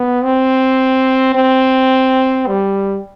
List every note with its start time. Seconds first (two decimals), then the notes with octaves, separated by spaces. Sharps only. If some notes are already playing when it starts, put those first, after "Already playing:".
Already playing: B3
0.24 C4
1.36 C4
2.47 G3